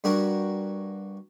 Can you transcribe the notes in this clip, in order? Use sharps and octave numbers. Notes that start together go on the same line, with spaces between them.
G2 G3 F#4 A#4